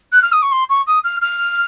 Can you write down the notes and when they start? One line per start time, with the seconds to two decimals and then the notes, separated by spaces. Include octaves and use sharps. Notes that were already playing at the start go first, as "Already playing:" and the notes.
0.12 F#6
0.22 F6
0.32 D#6
0.42 C#6
0.52 C6
0.69 C#6
0.87 D#6
1.04 F6
1.21 F6